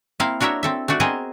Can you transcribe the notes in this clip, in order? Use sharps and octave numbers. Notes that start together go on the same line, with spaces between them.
A#3 C4 E4 F5
D4 F#4 A#4 C#5 E5
C4 A4 E5
A3 D4 F#4 D5
B3 C4 G#4 A#4 C5 D#5